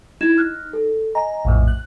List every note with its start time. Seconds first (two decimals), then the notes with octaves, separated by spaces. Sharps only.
0.21 D#4 E4 G#6 E7
0.38 F6 F#6
0.73 A4
1.15 D#5 G#5 A#5
1.45 A#1 F2 A2
1.68 F#6